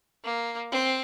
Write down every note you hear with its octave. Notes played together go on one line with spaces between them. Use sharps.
A#3
C4